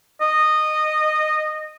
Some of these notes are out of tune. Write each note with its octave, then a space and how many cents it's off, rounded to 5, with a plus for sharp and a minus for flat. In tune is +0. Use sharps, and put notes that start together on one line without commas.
D#5 -15